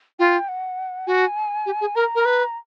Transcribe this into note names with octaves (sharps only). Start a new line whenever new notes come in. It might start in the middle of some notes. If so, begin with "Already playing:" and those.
F4 G5
F#5
F#4 G#5
G4
G#4
A#4 A#5
A#4
B4